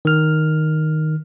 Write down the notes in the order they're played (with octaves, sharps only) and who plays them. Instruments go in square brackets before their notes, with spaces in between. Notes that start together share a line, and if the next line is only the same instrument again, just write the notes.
[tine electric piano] D#3 F6